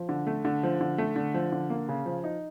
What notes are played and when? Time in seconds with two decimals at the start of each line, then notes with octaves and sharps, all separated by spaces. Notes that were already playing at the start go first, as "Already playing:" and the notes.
Already playing: F3
0.09 D3
0.27 A3
0.45 D3
0.63 F3
0.81 D3
0.98 A3
1.16 D3
1.34 F3
1.52 D3
1.70 A#3
1.88 C#3
2.06 F3
2.24 D#4